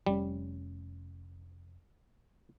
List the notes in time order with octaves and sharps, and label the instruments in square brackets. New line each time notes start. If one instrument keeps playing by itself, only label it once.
[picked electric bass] F1 C#4 [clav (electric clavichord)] G3